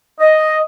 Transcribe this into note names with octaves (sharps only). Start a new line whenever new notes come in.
D#5